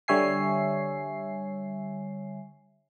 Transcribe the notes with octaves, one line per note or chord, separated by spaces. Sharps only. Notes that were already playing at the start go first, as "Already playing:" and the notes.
D3 G3 C#5 E5 G#5 C7